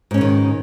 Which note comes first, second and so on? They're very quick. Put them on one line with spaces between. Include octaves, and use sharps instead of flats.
G#2 C#4 B2 D#3